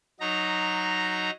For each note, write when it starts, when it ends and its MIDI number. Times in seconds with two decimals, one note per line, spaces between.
0.20 1.30 54
0.20 1.30 63
0.20 1.30 82